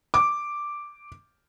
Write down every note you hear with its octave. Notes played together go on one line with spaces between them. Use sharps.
D6